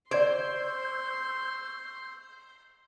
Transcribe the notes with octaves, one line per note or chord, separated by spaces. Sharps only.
C5 D5 C6 C#6 E6 G6 G#6 D7